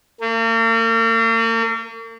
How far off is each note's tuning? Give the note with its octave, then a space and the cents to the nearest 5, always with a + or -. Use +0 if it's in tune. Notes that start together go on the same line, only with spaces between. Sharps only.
A#3 -45